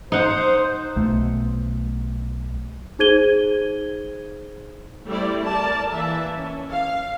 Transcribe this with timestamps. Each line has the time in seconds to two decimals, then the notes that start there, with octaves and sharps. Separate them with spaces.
0.12 D#4 C5 F#5
0.96 B1 A3
2.99 D#4 G#4 C5 G#6 D#7 G7
5.06 G3 A3 C4 E4 G4 D5
5.43 A#4 D5 A5
5.91 E3 A#3 E5 A5
6.35 C#4
6.71 F5